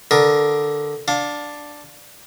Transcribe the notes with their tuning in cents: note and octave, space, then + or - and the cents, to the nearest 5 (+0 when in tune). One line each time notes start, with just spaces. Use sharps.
D3 +0 A#4 +20 D#6 +0
D4 +0 F5 +30